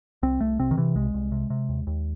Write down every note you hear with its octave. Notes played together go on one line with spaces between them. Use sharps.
C2 C4
C2 A3
C3 C4
D#3
C3 E3
C2 G#3
C2
C3
C3
D#2
D#2